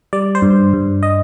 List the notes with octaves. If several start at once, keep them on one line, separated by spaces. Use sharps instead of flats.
G3 D5
C5
G2
G2
D#5